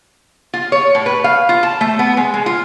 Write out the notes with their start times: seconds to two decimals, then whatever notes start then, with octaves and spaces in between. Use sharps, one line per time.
0.54 F4
0.72 C#5
0.95 A2
1.06 B4
1.24 F5
1.49 F4
1.63 A5
1.81 A3
1.99 B3
2.17 G#3
2.34 G#3
2.46 F4